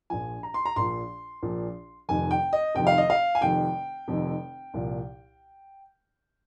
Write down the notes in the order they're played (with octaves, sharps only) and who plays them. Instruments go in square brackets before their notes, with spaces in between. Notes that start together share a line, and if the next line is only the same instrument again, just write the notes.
[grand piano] A#1 A#2 F3 G#5
A#5
C6
A#5
A#1 A#2 F3 C6
A#1 A#2 F3
F1 F2 D#3 G#5
G5
D#5
F1 F2 D#3 G5
F5
D#5
F5
G#5
F1 F2 D#3 G5
F1 F2 D#3
C2 A#2 F3